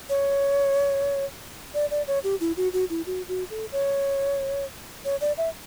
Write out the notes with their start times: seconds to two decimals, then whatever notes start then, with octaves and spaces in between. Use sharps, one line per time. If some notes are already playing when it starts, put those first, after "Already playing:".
0.09 C#5
1.74 D5
1.91 D5
2.07 C#5
2.24 G4
2.40 E4
2.57 F#4
2.73 F#4
2.90 E4
3.06 F#4
3.28 F#4
3.50 A4
3.72 C#5
5.05 C#5
5.21 D5
5.37 E5